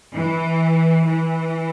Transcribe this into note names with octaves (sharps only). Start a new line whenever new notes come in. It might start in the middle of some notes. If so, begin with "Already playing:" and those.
E3
E3